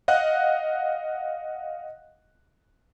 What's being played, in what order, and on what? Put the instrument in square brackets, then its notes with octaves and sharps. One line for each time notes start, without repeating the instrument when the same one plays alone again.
[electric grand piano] D#5 F5 F#5 F#6